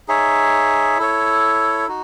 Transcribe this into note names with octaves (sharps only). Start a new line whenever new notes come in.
D#4 G#4 C#5 E5
E4 A4 C#5
D#4 F#4